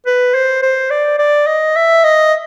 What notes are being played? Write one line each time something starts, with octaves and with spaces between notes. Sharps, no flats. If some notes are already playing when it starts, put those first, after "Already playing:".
B4
C5
C5
D5
D5
D#5
E5
D#5